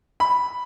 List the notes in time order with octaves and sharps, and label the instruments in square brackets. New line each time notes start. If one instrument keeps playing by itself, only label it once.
[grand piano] B5